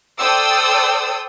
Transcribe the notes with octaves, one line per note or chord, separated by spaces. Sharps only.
A4 C5 D5 G5 D#6 E6